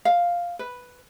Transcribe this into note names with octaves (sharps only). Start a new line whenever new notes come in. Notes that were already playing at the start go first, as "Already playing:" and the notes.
F5
B4